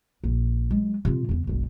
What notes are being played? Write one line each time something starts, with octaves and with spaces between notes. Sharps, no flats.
A#1
F#3 G#3
C3 F4
E2 C#3
F#1 B1